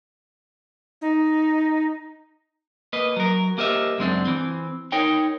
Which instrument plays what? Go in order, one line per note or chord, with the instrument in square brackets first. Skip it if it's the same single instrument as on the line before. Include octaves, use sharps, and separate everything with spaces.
[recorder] D#4
[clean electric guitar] A#3 B4 D#5
F#3 A#4
A#3 G4 A#4 C5 D#5 E5
C#2 F#2 G#3 C4 D4
E3 C4
D#4 A#4 C#5 G5